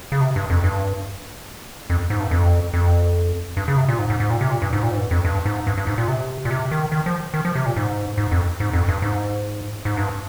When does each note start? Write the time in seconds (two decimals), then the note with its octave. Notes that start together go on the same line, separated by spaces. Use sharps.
0.12 C#3
0.21 C3
0.36 G2
0.50 F2
0.64 G2
1.90 F2
2.10 G#2
2.20 G2
2.31 F2
2.73 F2
3.57 G2
3.68 C#3
3.77 C3
3.89 A#2
3.99 G#2
4.10 G#2
4.20 G#2
4.30 A#2
4.41 C3
4.51 A#2
4.62 G2
4.73 G#2
4.83 A#2
4.91 G#2
4.97 G2
5.11 F2
5.25 G2
5.45 G#2
5.67 G2
5.78 G2
5.87 G#2
5.98 A#2
6.08 C3
6.45 A#2
6.51 C3
6.72 D#3
6.92 D#3
7.06 F3
7.34 D#3
7.45 F3
7.55 C3
7.66 A#2
7.76 G#2
8.18 G#2
8.32 F2
8.60 G#2
8.73 F2
8.88 G2
9.02 G#2
9.85 G#2
9.97 G2